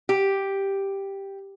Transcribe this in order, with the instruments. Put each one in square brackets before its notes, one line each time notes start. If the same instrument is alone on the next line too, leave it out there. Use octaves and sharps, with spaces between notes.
[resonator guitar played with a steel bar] G4